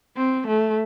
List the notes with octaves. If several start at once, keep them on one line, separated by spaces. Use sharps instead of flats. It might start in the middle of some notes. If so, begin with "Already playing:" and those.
C4
A3